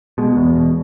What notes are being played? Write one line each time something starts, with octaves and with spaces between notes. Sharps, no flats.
B2 G#3
E2
B2